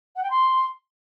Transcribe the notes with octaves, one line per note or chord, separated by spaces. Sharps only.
F#5
G5
C6